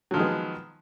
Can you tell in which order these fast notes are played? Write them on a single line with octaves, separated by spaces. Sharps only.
F#3 F3 D#3 G#3 B3